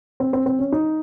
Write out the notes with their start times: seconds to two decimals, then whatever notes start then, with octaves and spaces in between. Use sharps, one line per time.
0.20 C4
0.33 C4
0.46 C4
0.59 C#4
0.72 D#4